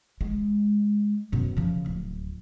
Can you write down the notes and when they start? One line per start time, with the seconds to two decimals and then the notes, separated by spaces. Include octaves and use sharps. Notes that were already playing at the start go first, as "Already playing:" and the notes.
0.21 G#3
1.32 F#2 B2
1.57 C#3 F3
1.86 D1